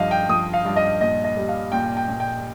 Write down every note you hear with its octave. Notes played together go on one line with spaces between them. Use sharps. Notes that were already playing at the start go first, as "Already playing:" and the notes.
Already playing: G2 F3 D#5 F5
G5
F3 D#6
F5
G2
D#5
A#2 D#5
D#5
G3
F5
A#2 G5
G5
A#2
G5